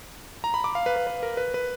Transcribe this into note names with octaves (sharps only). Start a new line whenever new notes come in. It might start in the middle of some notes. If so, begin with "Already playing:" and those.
A#5
B5
D6
F5
B4
B4
B4
A#4
B4
B4